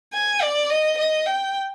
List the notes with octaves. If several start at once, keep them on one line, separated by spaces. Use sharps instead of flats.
G#5
D5
D#5
D#5
G5